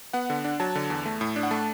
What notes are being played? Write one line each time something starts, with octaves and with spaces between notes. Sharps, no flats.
B3 F#5
D3
D4
F#3 A5
D3
E2
A3
A2
D4
F#5
A3 A5